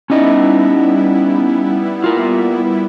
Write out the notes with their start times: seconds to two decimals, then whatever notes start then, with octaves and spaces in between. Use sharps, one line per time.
0.10 G3 B3 C#4 D#4 E4 D#5
2.04 F4 A#4